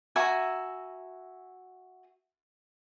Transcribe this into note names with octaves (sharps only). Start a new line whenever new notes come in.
F#4 E5 G#5 A#5